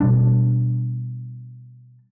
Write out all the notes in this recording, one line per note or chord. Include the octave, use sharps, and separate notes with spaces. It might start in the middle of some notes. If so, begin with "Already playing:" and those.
B2 G3 D4